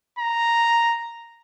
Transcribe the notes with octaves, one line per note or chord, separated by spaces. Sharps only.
A#5